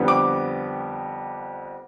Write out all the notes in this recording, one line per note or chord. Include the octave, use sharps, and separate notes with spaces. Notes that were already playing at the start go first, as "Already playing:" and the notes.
Already playing: F2 D3 G3 B3
D6